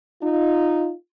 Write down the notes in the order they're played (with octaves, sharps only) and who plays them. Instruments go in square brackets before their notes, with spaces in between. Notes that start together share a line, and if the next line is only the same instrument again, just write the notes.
[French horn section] D#4 F4